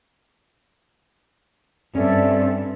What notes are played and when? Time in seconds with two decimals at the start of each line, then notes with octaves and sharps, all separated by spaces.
1.95 G2 C4 C#4 A4 D5 E5